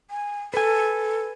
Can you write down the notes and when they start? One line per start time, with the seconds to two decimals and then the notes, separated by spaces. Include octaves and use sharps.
0.11 G#5
0.54 A4 B4 G#5